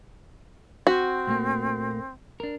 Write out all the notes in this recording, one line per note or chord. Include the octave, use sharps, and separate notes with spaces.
C4 F#4
A#2 A3 A#3
D4 A#4